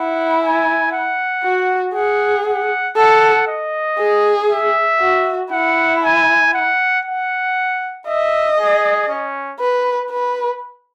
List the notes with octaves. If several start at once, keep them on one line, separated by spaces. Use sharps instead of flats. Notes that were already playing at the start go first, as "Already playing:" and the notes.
Already playing: E4 F#5
G#5
F#5
F#4
G#4 F#5
F#5
A4 F#5
D#5
G#4
E5
F#4
E4 F#5
G#5
F#5
F#5
D#5 E5
G#4
C#4
B4
B4